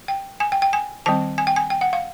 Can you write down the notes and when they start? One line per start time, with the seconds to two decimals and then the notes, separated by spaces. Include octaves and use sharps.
0.08 G5
0.40 G#5
0.52 G5
0.62 G5
0.73 G#5
1.06 D#3 G3 C4 A5
1.38 G#5
1.47 G5
1.56 G#5
1.70 G5
1.81 F#5
1.93 F5